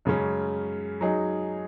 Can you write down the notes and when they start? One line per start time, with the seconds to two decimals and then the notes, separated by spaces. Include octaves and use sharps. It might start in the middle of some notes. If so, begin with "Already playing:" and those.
0.05 F#2 C#3 G#3 C#4
1.01 F#3 D#4 G#4